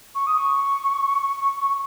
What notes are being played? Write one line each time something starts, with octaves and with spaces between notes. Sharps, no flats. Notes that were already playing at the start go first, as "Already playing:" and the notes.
C#6
D#6
C#6